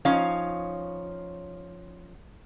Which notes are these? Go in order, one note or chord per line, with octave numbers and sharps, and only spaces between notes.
F3 C#4 D#4 C#5 F5